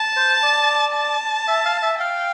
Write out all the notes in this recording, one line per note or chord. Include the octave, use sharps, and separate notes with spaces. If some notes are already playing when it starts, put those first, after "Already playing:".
Already playing: A5
C5
D5
A5
E5
F5
E5
F5 G5